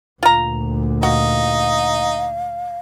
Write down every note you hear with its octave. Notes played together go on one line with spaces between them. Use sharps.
D2 A#2 F4 A#5
D#4 F#4 F5